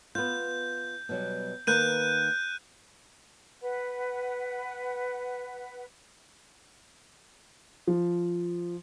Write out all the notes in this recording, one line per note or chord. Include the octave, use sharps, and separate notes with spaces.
B3 F4 G6
B2 F#3 G3
D#3 A#3 B4 F#6 G6 D#7
B4 F#5
F3